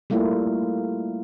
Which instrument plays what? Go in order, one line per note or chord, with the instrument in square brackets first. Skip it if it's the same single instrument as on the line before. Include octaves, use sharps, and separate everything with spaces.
[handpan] G3 A3 A#3 E4 F4